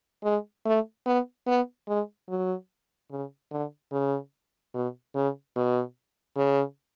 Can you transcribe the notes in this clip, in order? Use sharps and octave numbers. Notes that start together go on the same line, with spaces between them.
G#3
A3
B3
B3
G#3
F#3
C#3
D3
C#3
B2
C#3
B2
C#3